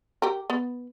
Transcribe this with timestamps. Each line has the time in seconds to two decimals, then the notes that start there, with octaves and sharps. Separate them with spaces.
0.22 G4 A#4
0.50 B3